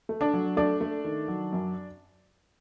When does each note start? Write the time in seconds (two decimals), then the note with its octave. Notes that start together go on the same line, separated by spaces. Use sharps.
0.09 A3
0.21 D4 D5
0.34 F#3
0.57 A3 D4 D5
0.81 A3
1.04 D#3
1.28 F#3
1.53 F#2